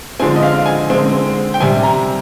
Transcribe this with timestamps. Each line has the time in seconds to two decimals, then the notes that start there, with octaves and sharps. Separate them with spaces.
0.20 D3 F3 G#3 C4 G#5
0.36 D#5
0.43 F5
0.66 G#5
0.90 D3 G#3 C4
1.54 G5
1.60 C3 G3 C4 G#5
1.83 A#5